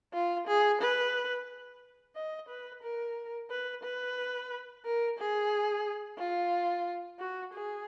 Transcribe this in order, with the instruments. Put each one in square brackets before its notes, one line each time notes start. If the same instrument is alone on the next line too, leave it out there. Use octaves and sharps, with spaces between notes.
[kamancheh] F4
G#4
B4
D#5
B4
A#4
B4
B4
A#4
G#4
F4
F#4
G#4